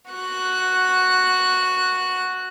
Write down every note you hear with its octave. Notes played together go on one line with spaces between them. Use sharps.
F#4 F#6